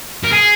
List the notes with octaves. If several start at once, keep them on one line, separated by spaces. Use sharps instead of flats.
A#4
G#4